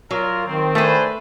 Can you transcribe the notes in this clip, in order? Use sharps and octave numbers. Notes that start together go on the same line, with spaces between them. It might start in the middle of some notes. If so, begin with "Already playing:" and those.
F#3 F4 A#4
D#3 C4
A3 D4 G#4 B4 C5